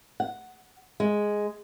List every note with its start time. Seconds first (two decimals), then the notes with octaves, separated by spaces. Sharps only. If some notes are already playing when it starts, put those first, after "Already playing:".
0.20 F#5
1.00 G#3